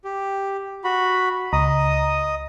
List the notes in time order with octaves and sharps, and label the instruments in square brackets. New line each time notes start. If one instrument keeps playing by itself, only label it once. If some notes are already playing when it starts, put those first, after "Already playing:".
[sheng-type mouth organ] G4
F#4 B5
[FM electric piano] C#2 A#5 [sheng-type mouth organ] D#5 D#6